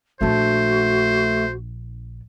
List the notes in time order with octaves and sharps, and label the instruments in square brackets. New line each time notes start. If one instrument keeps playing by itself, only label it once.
[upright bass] A#1 D4 [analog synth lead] A3 [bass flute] F#4 [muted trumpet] C5